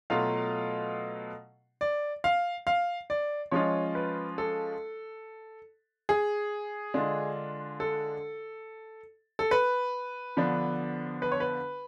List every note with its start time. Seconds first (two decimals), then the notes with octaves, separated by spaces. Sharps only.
0.10 B2 F#3 A3 F4 F5
1.81 D5
2.24 F5
2.67 F5
3.10 D5
3.51 F3 G#3 C#4 F4 C#5
3.95 B4
4.38 A4
6.09 G#4
6.94 D3 G#3 D4 F4
7.80 A4
9.39 A4
9.51 B4
10.37 D3 F3 B3 D4
11.22 B4
11.32 C#5
11.40 B4